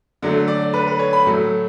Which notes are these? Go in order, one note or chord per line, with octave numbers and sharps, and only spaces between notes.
D3 F#3 A3
D5
B4
B4
C#5
B5
A2 F#3 A3